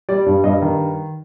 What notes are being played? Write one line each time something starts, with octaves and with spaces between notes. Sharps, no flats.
G3 D5
G2
G2 D#5
D#3